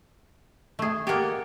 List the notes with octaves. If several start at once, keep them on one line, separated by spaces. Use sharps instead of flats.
A3 G#4
A#3 G4 A4 F#5 G#5